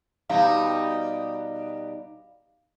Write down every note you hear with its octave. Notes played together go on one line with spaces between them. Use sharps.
B2 G3 D#4 F5